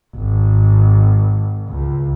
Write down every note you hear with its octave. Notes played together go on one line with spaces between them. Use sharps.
G#1
C#2